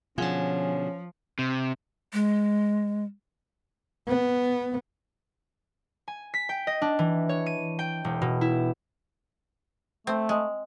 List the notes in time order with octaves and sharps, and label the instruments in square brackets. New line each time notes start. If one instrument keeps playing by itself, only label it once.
[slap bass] B2 D3 [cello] F3 [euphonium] C#4 [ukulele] F4 G#4 F#5
[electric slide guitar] C3
[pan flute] G#3
[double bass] B3
[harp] G#5
B6
G5
D#5
D4
E3
C#5
D#7
G5
E1
B2
E4
[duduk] A3 [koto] C4
[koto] G#3